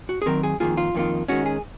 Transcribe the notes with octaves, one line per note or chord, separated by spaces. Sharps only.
F#4
G#4
D#3 F#3 C4 A#4
G#4
F2 D#3 A#3 F4 G#4
F4
F2 D#3 A#3 F4
D#3 G#3 C#4 F#4
G#4